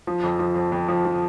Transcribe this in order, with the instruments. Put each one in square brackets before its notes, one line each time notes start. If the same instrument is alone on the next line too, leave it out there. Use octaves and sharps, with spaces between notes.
[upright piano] F3
F2
F3
F2
F2
F3
F3